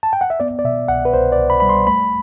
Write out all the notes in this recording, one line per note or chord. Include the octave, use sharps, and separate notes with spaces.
A5
G5
F#5
E5
B3 D5
D5
B2 E5
C2 F#5
B4
C2 C5
D5
C2
B5
G3 B5
C6
A3 B5